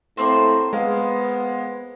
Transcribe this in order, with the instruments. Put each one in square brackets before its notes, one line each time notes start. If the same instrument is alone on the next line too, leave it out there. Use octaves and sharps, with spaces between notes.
[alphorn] A2 [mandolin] A#3 C4 C5
[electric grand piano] G#3 G#4 F5 [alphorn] B3